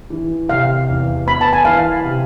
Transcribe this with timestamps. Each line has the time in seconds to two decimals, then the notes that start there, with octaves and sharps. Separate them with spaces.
0.10 E3
0.49 C3 F5
0.88 E2
1.26 B3 B5
1.41 A5
1.53 G#5
1.65 E3 F5
2.04 C3